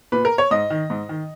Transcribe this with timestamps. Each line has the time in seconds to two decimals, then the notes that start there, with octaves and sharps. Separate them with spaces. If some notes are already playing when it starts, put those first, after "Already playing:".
0.12 A#2 B4
0.25 A#4
0.38 C#5
0.51 G#2 D#5
0.70 D#3
0.90 G#2
1.09 D#3